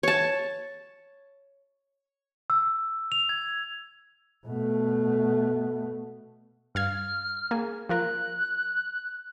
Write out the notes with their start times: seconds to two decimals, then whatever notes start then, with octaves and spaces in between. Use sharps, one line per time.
0.03 C#5 A5
2.50 E6
3.12 F7
3.29 G#6
4.47 B2 A3
6.75 G2 F5 F6 G#6
7.51 A#3 G#4
7.89 F3 F4 A#4 F#6